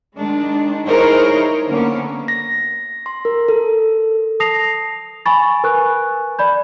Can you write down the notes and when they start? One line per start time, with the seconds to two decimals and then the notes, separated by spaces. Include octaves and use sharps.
0.16 D#3 G#3 D4
0.88 D#4 E4 G#4 A#4 C5 C#5
1.68 D3 A#3 B3 C#4
2.28 A#6
3.06 C6
3.25 A#4
3.49 A4
4.40 A5 D#6 A#6 C7 F7
5.26 G#5 B5 C#6 A6
5.64 A#4 B4 G#5 C#6 F#6
6.39 D5 B5 G6